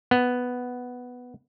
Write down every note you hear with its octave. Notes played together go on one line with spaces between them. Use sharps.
B3